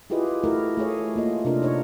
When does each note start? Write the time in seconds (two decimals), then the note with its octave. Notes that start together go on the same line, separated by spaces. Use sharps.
0.10 E4 F4 G4 G#4 B4 D#5
0.44 A3 E4 F#4 A#4
0.77 A3 G#4 C#5
1.16 A#3 F4 D#5
1.45 C3 D4 F4 A#4
1.62 D4 D#4 C#5